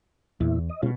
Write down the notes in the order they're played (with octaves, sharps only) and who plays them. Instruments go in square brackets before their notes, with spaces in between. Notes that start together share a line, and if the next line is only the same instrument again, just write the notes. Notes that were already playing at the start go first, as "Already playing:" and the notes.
[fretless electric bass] E2 [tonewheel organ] A#2 E4
[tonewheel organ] D#5
[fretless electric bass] B2 [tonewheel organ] G#3 C#4 F4